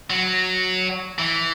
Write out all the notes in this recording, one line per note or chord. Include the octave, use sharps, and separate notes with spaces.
F#3
E3